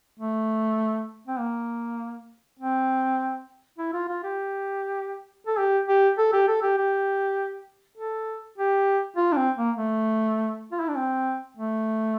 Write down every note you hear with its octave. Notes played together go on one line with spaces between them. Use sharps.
A3
C4
A#3
C4
E4
F4
F4
G4
A4
G4
G4
A4
G4
A4
G4
G4
A4
G4
F4
D4
C4
A#3
A3
F4
E4
D4
C4
A3